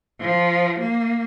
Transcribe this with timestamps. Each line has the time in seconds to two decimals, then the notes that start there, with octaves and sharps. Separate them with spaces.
0.21 F3
0.79 A#3